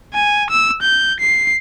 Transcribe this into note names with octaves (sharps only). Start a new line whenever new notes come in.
G#5
E6
G6
C7